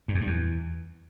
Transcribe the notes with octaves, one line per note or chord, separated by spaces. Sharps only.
G2
F2
G2
E2